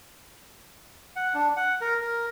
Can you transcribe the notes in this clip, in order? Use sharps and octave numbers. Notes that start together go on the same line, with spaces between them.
F#5
D4
F#5
A#4
A#4